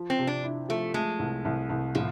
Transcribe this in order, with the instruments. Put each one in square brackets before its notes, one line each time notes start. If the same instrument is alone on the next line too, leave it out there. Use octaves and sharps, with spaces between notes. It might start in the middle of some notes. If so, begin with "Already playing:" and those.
Already playing: [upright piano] F3
[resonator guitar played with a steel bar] C4
[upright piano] C3
[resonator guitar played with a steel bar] D4
[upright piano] E4
[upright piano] F3 [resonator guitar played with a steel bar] A3
[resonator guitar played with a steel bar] G#3 [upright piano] A3
[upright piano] C2
C2
C2
[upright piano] A2 [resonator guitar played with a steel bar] F3